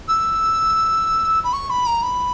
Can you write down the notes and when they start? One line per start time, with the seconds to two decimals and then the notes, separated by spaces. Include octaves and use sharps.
0.08 E6
1.44 B5
1.53 C#6
1.70 B5
1.86 A#5
2.03 B5